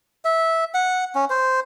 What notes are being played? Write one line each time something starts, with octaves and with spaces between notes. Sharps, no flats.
E5
F#5
C#4
C5